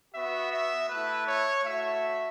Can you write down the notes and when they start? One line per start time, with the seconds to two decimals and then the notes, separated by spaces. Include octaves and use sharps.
0.13 B3 F#4 E5
0.51 E5
0.88 A3 E4 B4
1.26 C#5
1.64 A3 F#4 E5